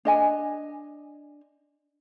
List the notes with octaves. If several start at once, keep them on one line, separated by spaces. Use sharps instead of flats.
D4 D#5 G#5